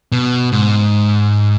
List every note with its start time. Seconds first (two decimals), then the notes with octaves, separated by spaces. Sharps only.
0.12 B2
0.52 G#2